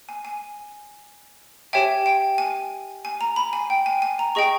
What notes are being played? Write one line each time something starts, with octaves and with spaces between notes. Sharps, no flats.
G#5
G#5
G4 C#5 E5 G5 G#5
G5
G#5
G#5
A#5
B5
G#5
G5
G#5
G#5
A#5
G#4 D#5 G5 C#6